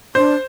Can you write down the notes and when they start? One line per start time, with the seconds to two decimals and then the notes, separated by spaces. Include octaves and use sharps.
0.15 D4 C5